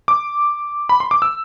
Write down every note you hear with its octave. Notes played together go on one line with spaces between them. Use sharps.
D6
B5
C6
D6
E6